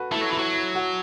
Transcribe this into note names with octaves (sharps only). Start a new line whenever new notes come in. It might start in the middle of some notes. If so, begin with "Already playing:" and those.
Already playing: F#4 A4 B4
A3 E4 A4
F#3
E3 E4
F#3
E4
F#4